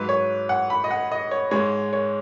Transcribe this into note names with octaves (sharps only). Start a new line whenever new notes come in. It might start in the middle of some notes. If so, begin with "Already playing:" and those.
Already playing: G#2 F#3 B4
C#5
F#5
B5
D#5
F#5
D#5
C#5
G#2 G#3 C#5
C#5